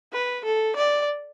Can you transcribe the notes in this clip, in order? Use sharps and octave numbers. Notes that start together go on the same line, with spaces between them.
B4
A4
D5